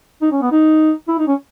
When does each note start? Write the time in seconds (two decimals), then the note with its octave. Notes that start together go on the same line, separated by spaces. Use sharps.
0.22 D#4
0.31 C#4
0.42 B3
0.51 D#4
1.08 E4
1.18 D#4
1.27 C#4